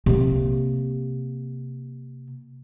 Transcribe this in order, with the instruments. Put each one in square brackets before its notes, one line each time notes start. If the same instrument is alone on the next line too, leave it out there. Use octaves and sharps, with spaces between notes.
[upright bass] C3 A#3